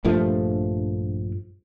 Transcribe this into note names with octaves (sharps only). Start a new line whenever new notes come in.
A#1 G2 F3 A3